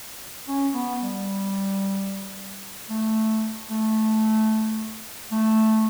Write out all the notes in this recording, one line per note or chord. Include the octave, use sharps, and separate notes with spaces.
C#4
B3
G3
A3
A3
A3